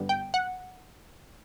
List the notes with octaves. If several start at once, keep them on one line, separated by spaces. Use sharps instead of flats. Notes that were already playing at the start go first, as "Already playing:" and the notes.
Already playing: G2 D3 G3 B3
G5
F#5